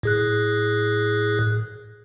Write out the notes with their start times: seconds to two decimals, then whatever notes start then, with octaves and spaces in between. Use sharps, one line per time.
0.03 A2 G#4 F#6